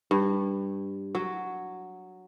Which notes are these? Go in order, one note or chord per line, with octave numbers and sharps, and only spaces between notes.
G2
F#3